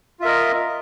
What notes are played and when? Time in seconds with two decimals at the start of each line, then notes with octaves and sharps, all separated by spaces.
0.20 F4
0.22 E5
0.25 A#4
0.27 D#5